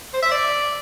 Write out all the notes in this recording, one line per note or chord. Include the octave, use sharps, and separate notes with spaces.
C5
E5
D5